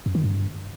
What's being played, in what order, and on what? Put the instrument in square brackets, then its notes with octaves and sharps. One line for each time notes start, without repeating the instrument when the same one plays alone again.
[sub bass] F#2
D#3
G2